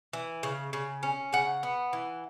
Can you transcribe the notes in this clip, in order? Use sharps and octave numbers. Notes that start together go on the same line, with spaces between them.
E3
C#3
C#3
C#4
C#3 F#5
B3
E3